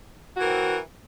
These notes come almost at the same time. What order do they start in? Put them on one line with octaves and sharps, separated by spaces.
F#4 E3 A#4 C4